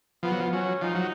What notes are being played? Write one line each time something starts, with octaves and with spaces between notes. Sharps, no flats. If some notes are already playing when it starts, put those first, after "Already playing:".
F3 B3
F#3
F3
F#3 C#4
F3 D#4
F#3